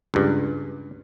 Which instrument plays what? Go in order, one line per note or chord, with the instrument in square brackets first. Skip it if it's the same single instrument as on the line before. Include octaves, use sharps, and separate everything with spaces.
[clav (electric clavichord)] C#2 G2